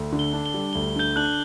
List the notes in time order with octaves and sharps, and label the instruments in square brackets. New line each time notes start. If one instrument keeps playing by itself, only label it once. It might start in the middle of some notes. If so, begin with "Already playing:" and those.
Already playing: [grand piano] D2
D3
[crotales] G7
[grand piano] D4
[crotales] G7
[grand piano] G3
[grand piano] D2 [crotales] G7
[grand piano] D3 [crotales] G6 G7
[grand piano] D4 [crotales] F#6 F#7